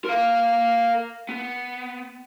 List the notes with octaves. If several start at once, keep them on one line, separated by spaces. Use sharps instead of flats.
A#4 F5
B3